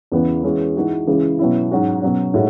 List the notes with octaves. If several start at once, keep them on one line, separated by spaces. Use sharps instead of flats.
E2 C#3 E3 B3
E3 G#3 C#4 F#4
E3 G#3 D#4 F#4
C#3 E3 G#3
B2 F#3 C#4 E4
G#2 F#3 C#4 F#4
B2 F#3 C#4
A2 G#3 D#4 F#4